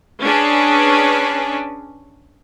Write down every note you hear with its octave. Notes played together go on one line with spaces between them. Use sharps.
C#4 D4 G#4 B4